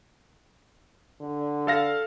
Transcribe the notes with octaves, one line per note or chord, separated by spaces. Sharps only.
D3
A4 F5 A#6